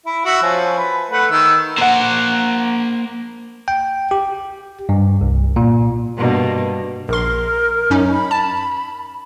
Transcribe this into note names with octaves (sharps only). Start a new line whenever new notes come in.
E4
F#4 E5 F#5
F3 C#4
B4
A3 B4 F#5
D#3 E6
A#3 C5 F#5 D#7
G5
G4
G2
C2
A#2
G2 B2 A#3
A#1 A#4 C6
F#2 C#4 D#4
B5
A5